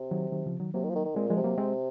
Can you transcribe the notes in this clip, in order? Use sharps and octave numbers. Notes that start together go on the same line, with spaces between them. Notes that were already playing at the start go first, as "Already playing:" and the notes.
Already playing: C3
D#3 F#3
D#3 F#3
C#3 F3
D#3 F#3
C3 F#3 A#3
D#3
F3
D#3
D#3
A#2 G#3 C4
F3 G#3
C3
F#3 A#3
G#3 C4